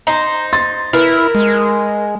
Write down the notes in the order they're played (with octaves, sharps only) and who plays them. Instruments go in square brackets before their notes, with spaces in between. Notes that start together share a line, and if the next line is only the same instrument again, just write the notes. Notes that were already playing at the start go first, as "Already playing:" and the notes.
[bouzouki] D#4 C5 [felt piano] A#5
[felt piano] C6 A6
[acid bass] E4 [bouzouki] A#4 [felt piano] B4
[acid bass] G#3